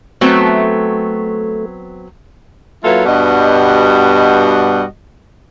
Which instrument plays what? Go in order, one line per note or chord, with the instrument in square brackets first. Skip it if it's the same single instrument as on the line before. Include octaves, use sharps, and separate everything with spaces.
[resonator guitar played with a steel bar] F#3 B3 C4 [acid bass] A3
[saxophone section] F#3 A#3 E4 F4 A4 B4
G2 B2 G3 F#4 D#5